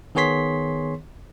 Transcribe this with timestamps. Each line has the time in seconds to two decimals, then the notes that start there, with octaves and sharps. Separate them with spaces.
0.15 D#3 B3 G#4 C#5 C6 B6